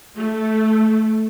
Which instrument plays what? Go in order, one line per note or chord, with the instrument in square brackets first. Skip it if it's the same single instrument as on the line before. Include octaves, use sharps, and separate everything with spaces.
[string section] A3